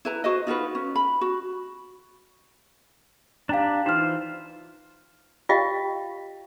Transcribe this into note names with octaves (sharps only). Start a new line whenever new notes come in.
E4 B4 A#5
F#4 C5 D#5
D#4 F4 F#4 B4
C#4
B5
F#4
D4 G4 F5 G5 A#5
E3 D#4 F4 C5 F6
F4 G4 D#5 F5 G5